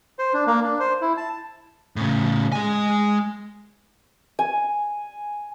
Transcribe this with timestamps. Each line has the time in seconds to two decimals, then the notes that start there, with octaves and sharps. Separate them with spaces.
0.19 C5
0.34 D4
0.47 A#3
0.64 D4
0.80 C5
1.01 E4
1.17 A5
1.96 A2 C#3
2.52 G#3 G#5
4.39 G#5